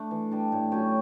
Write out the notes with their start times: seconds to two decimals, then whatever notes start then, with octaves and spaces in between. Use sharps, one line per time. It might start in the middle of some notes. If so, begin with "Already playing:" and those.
Already playing: A3 D4
0.11 E3
0.31 G3 D4
0.52 A2
0.72 F#3 C#4 G4